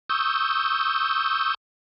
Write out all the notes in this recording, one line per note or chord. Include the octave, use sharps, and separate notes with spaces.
C#6 D#6 E6 G6